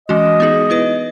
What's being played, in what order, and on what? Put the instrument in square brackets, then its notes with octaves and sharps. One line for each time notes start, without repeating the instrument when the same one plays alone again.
[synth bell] E3 G#3 C#4 F#4 [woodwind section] D#5
[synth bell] B3 D#4 G#4
B3 E4 B4